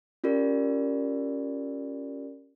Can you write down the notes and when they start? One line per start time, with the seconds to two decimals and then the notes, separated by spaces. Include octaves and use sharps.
0.24 C#4 F4 G4 A#4 D5